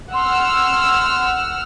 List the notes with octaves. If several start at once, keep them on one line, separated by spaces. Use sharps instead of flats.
F#5 C6 E6 F6